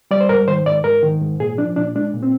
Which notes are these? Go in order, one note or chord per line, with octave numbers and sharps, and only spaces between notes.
G3 D5
C5
G#2 A#4
D#3 C5
G#2 D5
G#2 A#4
D#3
G#2
A#2 G#4
F3 D4
A#2 D4
G#3 D4
A#2
C4